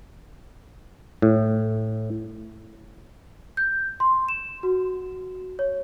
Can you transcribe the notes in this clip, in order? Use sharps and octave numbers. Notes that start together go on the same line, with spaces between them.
A2
G6
C6
E7
F#4
C#5